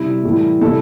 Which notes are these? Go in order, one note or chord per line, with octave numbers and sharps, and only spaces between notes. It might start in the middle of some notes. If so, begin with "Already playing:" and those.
Already playing: C3 G3 E4
A2 E3 G3
C3 E3 G3 E4 A4